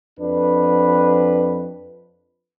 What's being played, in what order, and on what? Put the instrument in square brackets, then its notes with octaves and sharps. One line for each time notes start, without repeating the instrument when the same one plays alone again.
[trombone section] F2 D4 B4